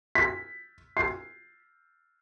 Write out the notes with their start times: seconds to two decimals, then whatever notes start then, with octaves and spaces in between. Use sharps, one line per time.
0.15 B6
0.97 C7